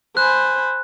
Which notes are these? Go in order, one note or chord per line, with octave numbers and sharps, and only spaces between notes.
C5 G#5 B5 F#6